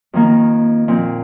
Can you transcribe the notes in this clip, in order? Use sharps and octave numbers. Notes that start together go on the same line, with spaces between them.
F2 D#3 A#3
A#2 F3 C4